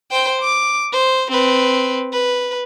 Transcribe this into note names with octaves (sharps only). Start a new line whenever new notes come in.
C5 G5
D6
C5
C4 B4
B4